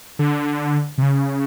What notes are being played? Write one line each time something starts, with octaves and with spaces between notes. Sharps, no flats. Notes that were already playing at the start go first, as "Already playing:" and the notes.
D3
C3
C#3